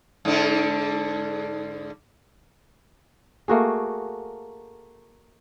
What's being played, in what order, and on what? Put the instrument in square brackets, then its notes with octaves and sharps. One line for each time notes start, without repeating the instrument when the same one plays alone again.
[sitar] G#2 D3 D4
[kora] A3 A#3 F#4 G#4